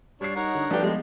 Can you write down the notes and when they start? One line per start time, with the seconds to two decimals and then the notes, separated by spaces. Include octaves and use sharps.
0.21 G3 D4 C#5 C7
0.36 D#4 A#4 C#5 F#5
0.55 D3
0.71 F3 G3 A3 D4 G4 B4
0.84 G#3 B3